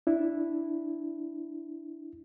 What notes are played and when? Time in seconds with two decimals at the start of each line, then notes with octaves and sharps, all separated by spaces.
0.07 D4 E4